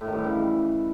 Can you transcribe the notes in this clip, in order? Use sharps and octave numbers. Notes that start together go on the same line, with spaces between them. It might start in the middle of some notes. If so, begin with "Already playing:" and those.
A2
D#3
G2
E3
C#3